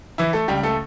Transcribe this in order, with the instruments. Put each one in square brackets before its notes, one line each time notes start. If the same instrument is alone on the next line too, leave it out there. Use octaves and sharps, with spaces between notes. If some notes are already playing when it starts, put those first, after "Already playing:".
[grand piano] E3 E4
A3 A4
C#2 G3 G4
A3 A4